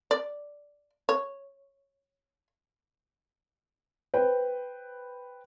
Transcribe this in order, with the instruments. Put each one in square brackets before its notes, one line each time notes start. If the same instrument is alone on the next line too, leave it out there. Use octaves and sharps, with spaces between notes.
[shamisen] D5
C#5
[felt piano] B4 C5 G5